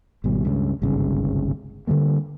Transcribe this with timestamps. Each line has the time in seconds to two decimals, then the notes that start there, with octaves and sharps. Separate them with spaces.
0.24 G#1 B2 G3
0.45 C#2 G2 A#2 C#3
0.82 G1 C2 G#2 C#3
1.87 D3 E3 G3 A#3